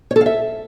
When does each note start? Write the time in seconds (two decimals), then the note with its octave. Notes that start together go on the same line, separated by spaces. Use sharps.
0.11 C#5
0.16 A4
0.21 F5
0.26 E5